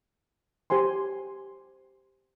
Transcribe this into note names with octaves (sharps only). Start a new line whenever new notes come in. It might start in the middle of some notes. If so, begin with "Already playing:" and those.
G4 C5 G#5 C6